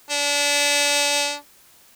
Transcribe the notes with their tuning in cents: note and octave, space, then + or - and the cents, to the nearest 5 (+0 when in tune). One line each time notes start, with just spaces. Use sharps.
D4 -30